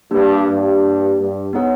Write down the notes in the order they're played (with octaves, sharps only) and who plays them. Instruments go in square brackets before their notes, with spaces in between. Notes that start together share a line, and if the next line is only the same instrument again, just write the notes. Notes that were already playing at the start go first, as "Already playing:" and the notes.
[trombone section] G2 [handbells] A#3 D4 G4
[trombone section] G2
G2
[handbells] B3 D#4 G#4 C#5 F#5